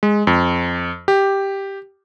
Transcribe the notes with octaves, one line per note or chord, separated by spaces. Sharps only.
G#3
F2
G4